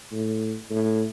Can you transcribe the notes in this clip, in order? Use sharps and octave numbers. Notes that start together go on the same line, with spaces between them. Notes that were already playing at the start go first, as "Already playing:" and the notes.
A2
A2